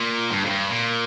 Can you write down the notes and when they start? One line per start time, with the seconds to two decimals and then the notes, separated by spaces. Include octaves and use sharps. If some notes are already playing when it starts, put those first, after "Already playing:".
Already playing: A#2
0.31 G2
0.45 F2
0.49 G2
0.69 A#2